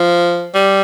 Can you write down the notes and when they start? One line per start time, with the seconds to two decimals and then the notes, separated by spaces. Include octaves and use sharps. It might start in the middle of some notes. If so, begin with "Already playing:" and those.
Already playing: F3
0.55 G3